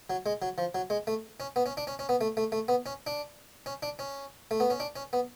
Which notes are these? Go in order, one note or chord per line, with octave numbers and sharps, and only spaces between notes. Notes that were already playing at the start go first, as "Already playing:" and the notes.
F#3
G#3
F#3
F3
F#3
G#3
A3
C#4
B3
C#4
D4
C#4
C#4
B3
A3
A3
A3
B3
C#4
D4
C#4
D4
C#4
A3
B3
C#4
D4
C#4
B3